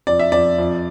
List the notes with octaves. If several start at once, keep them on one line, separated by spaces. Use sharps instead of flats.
F2 D5
E5
F2 D5
F2